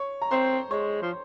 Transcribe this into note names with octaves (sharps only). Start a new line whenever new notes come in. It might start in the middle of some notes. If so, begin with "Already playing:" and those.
Already playing: C#5 C#6
A#5
C4 C5 C6
G#3 C#5 C#6
F3